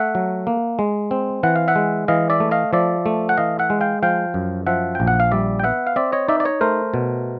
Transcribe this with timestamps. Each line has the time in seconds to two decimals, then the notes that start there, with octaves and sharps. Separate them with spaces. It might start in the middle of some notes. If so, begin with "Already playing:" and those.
Already playing: A3 E5 F#5
0.15 F#3
0.47 A#3
0.79 G#3
1.11 C4
1.43 E3 F#5
1.56 F5
1.68 E5 F#5
1.76 G#3
2.08 E3 D#5 F5
2.30 D5 E5
2.40 A3
2.51 D#5 F5
2.73 F3 D5 E5
3.06 A3
3.29 F#5
3.37 E3 D#5 F5
3.59 E5 F#5
3.70 G#3
3.81 F5 G5
4.03 F3 F5 G5
4.34 F#2
4.66 F3 E5 F#5
4.95 A#1 G5
5.07 F#5
5.20 F5
5.31 G3 D5 E5
5.59 G5
5.64 B3 E5 F#5
5.87 F5
5.96 C4 D5 E5
6.12 C#5 D#5
6.28 D#4 D5 E5
6.40 D5
6.45 C#5 D#5
6.61 A3 A#4 C5
6.94 B2